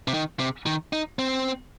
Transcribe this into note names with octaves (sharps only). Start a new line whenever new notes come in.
C3
D#3
C3
D#3
D#4
C4